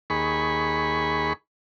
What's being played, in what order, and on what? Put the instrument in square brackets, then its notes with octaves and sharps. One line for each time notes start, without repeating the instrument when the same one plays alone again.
[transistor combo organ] D#2 G#4 B5 C#6